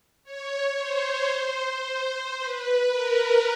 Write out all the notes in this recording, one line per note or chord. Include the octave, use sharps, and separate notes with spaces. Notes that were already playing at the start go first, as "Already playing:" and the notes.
C#5
C5
C5
B4
A#4